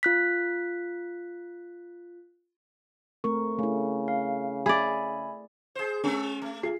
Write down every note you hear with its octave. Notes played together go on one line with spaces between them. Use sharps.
F4 F#6 B6
A3 C4 A#4 C#6
C#3 A3 E4
F5
G#4 D5 E5 G#5 B5
G#4 C5
G#3 C#4
A3
F4 G#4 C7